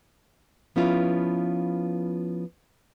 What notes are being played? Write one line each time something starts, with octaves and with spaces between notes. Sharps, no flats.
F3 B3 C#4 E4 F4